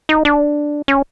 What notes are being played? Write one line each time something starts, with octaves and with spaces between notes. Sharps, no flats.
D#4
D4
C#4